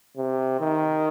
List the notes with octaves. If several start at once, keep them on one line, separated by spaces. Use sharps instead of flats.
C3
D#3